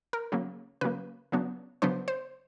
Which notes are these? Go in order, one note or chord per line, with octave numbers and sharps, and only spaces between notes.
A#4
C#3 F#3 A#3
C#3 F#3 A#3 B4
C#3 F#3 B3 D4
C#3 F#3 B3 D4 C5
C5